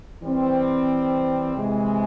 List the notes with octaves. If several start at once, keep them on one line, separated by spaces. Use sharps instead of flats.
E3 G3 C4
C3 E3 G#3